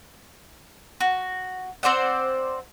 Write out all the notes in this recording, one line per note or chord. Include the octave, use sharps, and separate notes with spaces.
F#4
C4 C5 D5 F#5